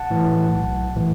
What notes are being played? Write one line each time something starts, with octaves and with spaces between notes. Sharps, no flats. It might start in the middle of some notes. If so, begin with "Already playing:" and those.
Already playing: F#5 A5
A2 E3
B1
A2 E3